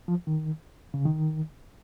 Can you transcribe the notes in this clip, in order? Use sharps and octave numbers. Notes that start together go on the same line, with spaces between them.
F3
D#3
C#3
D#3